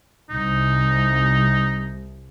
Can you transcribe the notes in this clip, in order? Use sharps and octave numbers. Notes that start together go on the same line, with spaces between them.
C2 D#4